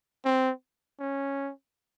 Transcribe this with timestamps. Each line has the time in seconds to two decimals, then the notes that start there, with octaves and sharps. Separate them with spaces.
0.25 C4
1.00 C#4